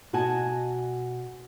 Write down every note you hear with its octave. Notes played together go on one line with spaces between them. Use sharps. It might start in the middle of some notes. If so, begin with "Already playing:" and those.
B2 F#4 D#5 G#5 A5